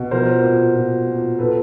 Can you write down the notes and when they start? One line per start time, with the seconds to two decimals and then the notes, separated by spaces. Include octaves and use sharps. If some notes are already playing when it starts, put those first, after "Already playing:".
Already playing: B2
0.11 F3 A#4 C5
0.44 A#2
0.75 A#2
1.07 A#2
1.38 A#2 A4 B4